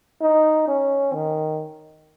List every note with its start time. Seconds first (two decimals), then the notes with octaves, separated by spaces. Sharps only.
0.22 D#4
0.68 C#4
1.13 D#3